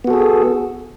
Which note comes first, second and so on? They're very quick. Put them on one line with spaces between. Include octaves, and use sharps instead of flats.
B3 F#4 A4 G#4